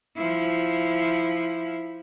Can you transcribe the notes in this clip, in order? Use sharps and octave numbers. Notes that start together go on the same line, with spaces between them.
F3 E4